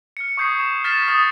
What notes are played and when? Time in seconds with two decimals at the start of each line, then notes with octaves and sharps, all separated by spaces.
0.17 F6 C#7
0.37 C#6 D#6 G6 G#6 C7
0.60 E7
0.84 F6 A6 B6 C7 E7
1.08 D#6 A6